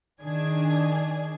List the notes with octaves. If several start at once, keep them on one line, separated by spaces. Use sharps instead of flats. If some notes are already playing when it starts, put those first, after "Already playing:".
D#3 D4 G#4 G#6